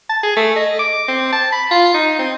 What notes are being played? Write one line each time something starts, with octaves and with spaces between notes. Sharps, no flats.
A5
G#4
A3
D#5
D6
C4
A5
B5
F4
D#4
C4